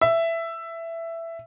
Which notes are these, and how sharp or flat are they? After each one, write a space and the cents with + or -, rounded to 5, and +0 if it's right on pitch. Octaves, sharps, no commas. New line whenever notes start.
E5 +10